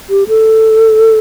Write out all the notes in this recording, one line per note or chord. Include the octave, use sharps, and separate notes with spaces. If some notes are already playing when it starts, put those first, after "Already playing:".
G4
A4